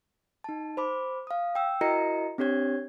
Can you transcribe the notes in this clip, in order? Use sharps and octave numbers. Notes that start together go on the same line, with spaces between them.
D#4 A5
C5 B5 D6
F5 D#6
G5 E6
E4 F#4 A#4 D#5 A#5 C#7
C4 D4 G4 C#5 G#6